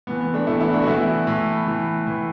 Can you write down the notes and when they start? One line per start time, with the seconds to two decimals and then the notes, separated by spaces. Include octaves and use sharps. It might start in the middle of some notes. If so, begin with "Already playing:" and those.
0.07 A2 E3 B3
0.21 B3
0.34 A3 D4
0.47 A2 E3 B3 E4
0.60 B3 E4
0.73 A3 D4
0.82 F#4
0.87 A2 E3 B3 E4
1.27 A2 E3
1.67 A2 E3
2.07 A2 E3